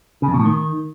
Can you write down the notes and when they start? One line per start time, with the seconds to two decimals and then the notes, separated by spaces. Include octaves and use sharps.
0.22 C#3
0.28 F2
0.34 B2
0.40 A2
0.45 D#3